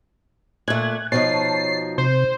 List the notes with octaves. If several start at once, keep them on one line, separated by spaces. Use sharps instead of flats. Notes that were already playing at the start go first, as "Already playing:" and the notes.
A#2 A3 F#6 G#6
B2 F3 D#4 C#5 A5 C7
C3 C5